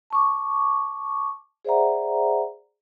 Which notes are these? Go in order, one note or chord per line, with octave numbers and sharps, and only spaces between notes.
A5 C#6 D6
G#4 C5 D5 E5 F#5 A#5